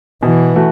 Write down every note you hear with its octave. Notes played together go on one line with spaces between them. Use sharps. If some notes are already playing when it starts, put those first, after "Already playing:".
B2 E3
A3 F#4